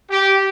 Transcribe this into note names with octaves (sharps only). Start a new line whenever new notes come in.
G4